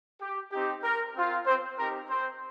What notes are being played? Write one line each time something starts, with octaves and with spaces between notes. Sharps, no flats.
G4
C4 D#4 G4
A#4
C4 F4
C4 C5
C4 D#4 G4 A#4
C4 C5